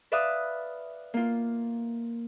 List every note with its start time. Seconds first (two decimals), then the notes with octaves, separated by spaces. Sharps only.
0.12 B4 D5 E5 F5 D#6 F#6
1.14 A#3 F4